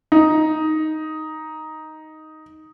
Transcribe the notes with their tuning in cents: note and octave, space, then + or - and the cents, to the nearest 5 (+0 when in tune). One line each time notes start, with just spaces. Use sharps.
D#4 +5